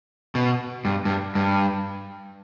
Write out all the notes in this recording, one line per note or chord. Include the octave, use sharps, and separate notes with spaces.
B2
G2
G2
G2